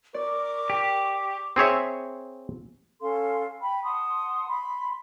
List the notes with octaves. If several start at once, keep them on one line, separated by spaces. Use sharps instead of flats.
A#4 D5 C#6 D6
G4
C4 G#4 C#5 E5
C#4 A4 F5 C6
G5 B5
F#5 A5 C6 D#6
B5 C6